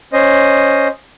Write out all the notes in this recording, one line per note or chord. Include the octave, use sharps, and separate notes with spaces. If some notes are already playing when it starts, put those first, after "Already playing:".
C#4 C5 D#5